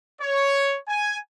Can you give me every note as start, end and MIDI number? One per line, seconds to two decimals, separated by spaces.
0.21 0.77 73
0.88 1.17 80